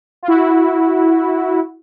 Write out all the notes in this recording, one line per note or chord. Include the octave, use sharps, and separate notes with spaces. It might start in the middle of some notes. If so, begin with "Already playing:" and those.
F4
E4 F#4